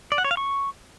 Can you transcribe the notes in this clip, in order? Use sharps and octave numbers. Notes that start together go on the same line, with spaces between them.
D5
F#5
C#5
F5
C#6